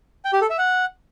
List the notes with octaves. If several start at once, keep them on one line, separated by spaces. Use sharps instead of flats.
G5
G4
A4
E5
F#5